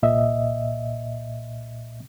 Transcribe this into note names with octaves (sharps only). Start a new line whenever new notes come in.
C2 A#2 D#5 E5